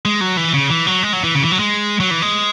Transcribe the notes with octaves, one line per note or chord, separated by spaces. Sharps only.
G#3
F#3
E3
C#3
E3
F#3
G#3
F#3
E3
C#3
E3
F#3
G#3
F#3
E3
G#3